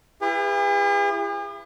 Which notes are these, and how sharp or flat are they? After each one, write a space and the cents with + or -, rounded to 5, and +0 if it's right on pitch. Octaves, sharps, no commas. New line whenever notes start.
E4 +35 G#4 -45 B4 +0